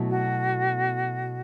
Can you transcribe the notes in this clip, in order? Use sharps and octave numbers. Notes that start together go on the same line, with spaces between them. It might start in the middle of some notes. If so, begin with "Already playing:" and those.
Already playing: B2 F#3 A3 E4 A4
F#4